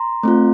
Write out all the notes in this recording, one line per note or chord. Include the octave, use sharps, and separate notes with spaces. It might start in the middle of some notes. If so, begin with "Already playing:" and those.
Already playing: A#5 C6
A3 C4 F4